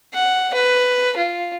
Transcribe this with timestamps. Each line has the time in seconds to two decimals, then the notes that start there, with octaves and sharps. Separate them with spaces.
0.13 F#5
0.53 B4
1.16 F4